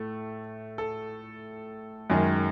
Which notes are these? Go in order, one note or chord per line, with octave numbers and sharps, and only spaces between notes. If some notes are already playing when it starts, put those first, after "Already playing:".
Already playing: A2 A3
A4
F#2 D#3 G#3 G#4